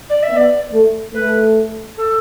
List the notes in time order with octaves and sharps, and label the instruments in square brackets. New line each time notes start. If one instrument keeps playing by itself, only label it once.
[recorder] D5
E5
[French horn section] B3
[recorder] D5
[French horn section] A3
[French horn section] A3 [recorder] B4
[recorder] A4